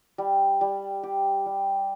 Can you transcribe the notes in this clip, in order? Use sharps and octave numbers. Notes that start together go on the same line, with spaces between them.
G3
G3
G4
G3